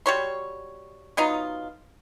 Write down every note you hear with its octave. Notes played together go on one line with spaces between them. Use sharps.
G3 F#4 C#5 C6
F#3 B3 D#4 F4